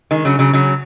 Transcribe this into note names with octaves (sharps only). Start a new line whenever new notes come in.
D#3 G#3
C#3 F#3
C#3 F#3
C#3 F#3